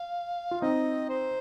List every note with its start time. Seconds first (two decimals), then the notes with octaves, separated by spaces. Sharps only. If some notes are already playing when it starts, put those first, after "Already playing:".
Already playing: F5
0.51 F4
0.61 C4 D#4 D#5
1.09 C5